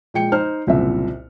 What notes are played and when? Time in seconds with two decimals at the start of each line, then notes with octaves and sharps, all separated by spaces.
0.14 A#2 G#3 G5 C#7
0.32 D#4 C5 F6
0.67 F#1 C2 A#2 C4 E5